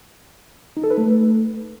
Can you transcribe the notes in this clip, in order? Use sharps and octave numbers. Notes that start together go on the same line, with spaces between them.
D#4
A4
B4
A3